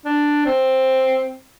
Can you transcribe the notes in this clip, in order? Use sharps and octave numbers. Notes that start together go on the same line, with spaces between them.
D4
C4